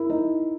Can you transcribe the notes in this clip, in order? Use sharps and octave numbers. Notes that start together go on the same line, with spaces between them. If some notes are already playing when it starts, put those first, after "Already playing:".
Already playing: E4 A#4
D#4